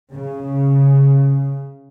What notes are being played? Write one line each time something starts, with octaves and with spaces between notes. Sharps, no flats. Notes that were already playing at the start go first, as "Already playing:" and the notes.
C#3